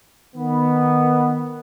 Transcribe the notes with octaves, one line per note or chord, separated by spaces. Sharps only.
D#3 B3